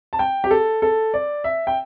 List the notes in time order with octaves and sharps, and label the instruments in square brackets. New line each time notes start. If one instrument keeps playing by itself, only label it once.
[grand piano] A5
G5
G4
A4
A4
D5
E5
G5